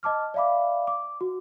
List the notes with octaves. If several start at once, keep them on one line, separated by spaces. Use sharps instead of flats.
D#5 A5 D6 F6
D5 E5 F5 B5 D6
D6
F#4